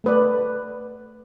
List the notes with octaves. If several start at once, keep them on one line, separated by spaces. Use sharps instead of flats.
A3 B4 D5